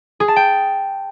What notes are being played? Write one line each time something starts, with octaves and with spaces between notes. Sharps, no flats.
G#4
A5
G5